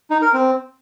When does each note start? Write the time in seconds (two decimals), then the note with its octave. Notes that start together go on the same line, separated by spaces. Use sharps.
0.10 D#4
0.22 A#4
0.34 C4